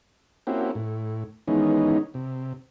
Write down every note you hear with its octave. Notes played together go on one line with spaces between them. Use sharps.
A#3 C4 C#4 E4 F#4 G4
A2
D#3 E3 G#3 B3 C#4 D#4
C3